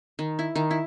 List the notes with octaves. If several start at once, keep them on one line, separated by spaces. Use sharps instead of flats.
D#3
E4
D#3
E4